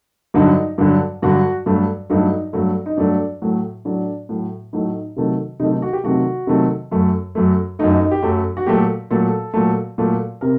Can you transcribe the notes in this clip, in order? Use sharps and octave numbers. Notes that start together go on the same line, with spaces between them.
G2 D3 F#3 D#4
G2 D3 F#3
G2 D3 F#3 F#4
G2 F#3 A3
G2 F#3 A3 D#4
G2 F#3 A3
D#4
G2 F#3 A3 D4
A2 F#3 A3
A2 F#3 A3 D4
A2 F#3 A3
A2 F#3 A3 D#4
C3 D#3 F#3 A3
C3 D#3 F#3 A3 D#4
D#4
F#4
G4
C3 D#3 F#3 A3 F#4
C3 D#3 F#3 A3
F#2 F#3 A3
F#2 F#3 A3
F#2 F#3 A3 D#4
D#4
D#4
G4
F#2 F#3 A3
F#4
A#2 F#3 A3 G4
A#2 F#3 A3 A4
A#2 F#3 A3
A#2 F#3 A3
C3 A#4